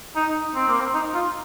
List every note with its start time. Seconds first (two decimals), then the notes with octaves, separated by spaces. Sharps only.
0.16 D#4
0.55 C4
0.68 A#3
0.80 C4
0.94 D#4
1.14 F4